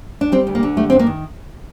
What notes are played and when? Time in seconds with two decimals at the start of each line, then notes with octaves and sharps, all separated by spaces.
0.21 D4
0.32 G3 C4
0.47 D2
0.55 A#3
0.63 D3
0.77 G3 A3
0.90 G2 C4
0.99 A#3
1.07 D#3